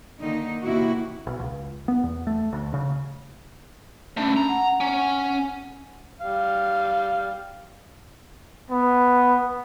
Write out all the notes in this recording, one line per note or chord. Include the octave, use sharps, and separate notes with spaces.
D3 D#3 A#3 D#4
E2 C3 A#3 E4 F#4
B1
C#2
B3
E2
A3
D2
C#3
A3 C#4 D4 B5
A#5
F#5
C#4
G3 F5
B3